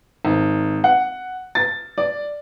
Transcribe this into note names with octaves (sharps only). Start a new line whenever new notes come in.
G#1
F#5
A6
D5